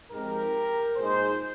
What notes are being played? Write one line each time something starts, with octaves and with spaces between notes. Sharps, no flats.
G#2 F3 G#3 C4 G4 A#4
A#2 G#3 D#4 G#4 C5